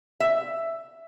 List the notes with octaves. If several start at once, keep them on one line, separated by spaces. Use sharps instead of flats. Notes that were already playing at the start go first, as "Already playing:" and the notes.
E5